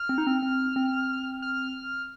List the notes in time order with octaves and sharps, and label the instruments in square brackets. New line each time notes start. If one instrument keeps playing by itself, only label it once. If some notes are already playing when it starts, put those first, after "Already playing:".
Already playing: [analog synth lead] F6
[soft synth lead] C4
D#4
C4
C4
C4
[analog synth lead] F6